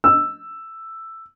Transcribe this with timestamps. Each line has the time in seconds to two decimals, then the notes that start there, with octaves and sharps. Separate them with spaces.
0.04 E6